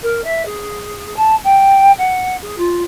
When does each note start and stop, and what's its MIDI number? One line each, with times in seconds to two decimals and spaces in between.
0.02 0.21 70
0.24 0.44 76
0.45 1.14 68
1.16 1.35 81
1.44 1.91 79
1.98 2.36 78
2.41 2.55 68
2.58 2.82 65